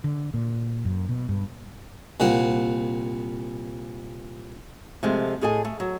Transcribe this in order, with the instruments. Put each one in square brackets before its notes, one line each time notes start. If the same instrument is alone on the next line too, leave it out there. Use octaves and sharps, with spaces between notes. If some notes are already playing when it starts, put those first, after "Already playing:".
[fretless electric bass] D3
A#2
F#2
B2
G2
[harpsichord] C2 A#2 C4 F#5
[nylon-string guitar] C3 F3 G#3 A3
A2 G#4 A4 D#5 G#5
A3
F#3